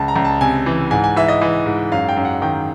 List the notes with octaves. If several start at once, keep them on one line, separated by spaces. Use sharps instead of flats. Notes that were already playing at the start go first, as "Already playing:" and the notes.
Already playing: C#2 A5
A#5
C#2
A5
C3 G#5
E3
G#2 G#5
G#5
E3 E5
D#5
E3
G#2
F#2 F5
G5
F#2
F#5
D#3 G5